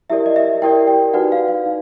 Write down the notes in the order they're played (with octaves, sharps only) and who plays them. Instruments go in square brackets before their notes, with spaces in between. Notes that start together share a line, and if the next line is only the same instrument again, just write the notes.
[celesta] E4 G4 A#4 D5 E5
D#5
E5
E4 G4 A#4 D5 G5
G5
D#4 F#4 B4 D5 F#5
F5
F5
D#4